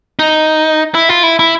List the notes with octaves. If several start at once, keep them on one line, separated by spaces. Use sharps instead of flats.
D#4
E4
F4
E4
E4